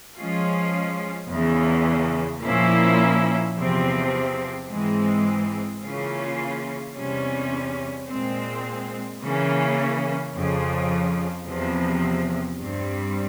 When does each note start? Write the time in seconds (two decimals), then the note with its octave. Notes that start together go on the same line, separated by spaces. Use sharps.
0.18 F3 G#3 C#4 F4
1.30 E2 C#3 E3
2.44 A#2 F3 A#3 C#4 E4
3.56 E2 C3 F3 C4
4.69 G#2 E3 G#3 C4
5.82 C#3 E3 A#3 C#4 F4
6.96 E2 C3 G3 C#4
8.08 A#2 G#3 C4
9.21 C#3 E3 A#3 C#4
10.34 F2 C#3 F3
11.48 E2 C3 F3
12.60 G2 G3 C4